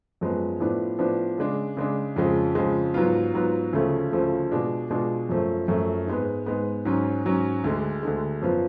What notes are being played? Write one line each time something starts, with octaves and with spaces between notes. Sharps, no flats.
F#2 F3 G#3 B3
A2 F3 B3 D4
A2 F3 B3 D4
C#3 G#3 D4
C#3 G#3 D4
F2 C#3 F3 G#3
F2 C#3 F3 G#3
G#2 F#3 B3 F4
G#2 F#3 B3 F4
D2 C#3 F3 A3
D2 C#3 F3 A3
B2 G#3 D4 F4
B2 G#3 D4 F4
F#2 F3 A3
F#2 F3 A3
G#2 G#3 B3
G#2 G#3 B3
G#2 F#3 C#4
G#2 F#3 C#4
D2 D3 G#3
D2 D3 G#3
F#2 F3 B3 F4